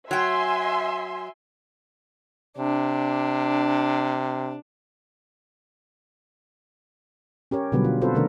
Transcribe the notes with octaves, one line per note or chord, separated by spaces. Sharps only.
F#3 E5 G5 G#5 C6
C3 D4
C#4 G4 A#4 C#5
B2 D3 F#3 G3 B3 B4
F4
C4 F4 F#4 A4 B4 C5
C3 D#3 A3 D4 A#4